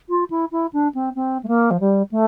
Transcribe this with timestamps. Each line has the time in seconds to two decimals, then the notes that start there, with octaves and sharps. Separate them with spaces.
0.09 F4
0.30 E4
0.51 E4
0.73 D4
0.94 C4
1.15 C4
1.43 A3
1.47 A#3
1.70 F3
1.80 G3
2.11 A3